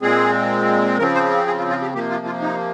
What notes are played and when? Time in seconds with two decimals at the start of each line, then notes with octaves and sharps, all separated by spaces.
0.02 A#2 G#3 C4 G#4
0.98 C#3 F3 C4 A#4
1.14 C5
1.47 G#4
1.58 F4
1.70 F4
1.82 G4
1.94 C3 F3 A#3 G4
2.11 F4
2.26 F4
2.42 D#4